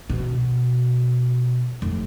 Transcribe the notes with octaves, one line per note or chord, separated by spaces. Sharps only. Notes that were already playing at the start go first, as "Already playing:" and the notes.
B2
F1